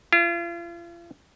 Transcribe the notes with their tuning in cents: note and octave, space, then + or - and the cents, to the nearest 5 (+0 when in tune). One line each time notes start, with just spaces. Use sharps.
F4 -40